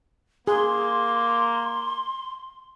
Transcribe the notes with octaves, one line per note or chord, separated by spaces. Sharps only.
A#3 G#4 C6